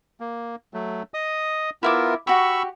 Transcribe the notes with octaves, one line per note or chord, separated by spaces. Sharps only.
A#3
F#3 A3
D#5 D#6
B3 E4 F4 A#4 E5 D6
F#4 G4 B5 C#6 E6